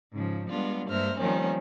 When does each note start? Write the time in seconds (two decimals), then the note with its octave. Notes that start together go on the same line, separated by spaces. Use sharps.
0.13 G#2 C#3 F3
0.48 G3 G#3 B3 D4 F4
0.88 G2 G#3 A#3 C5 E5 F6
1.18 D#3 F3 G3 A#3 C4 C#4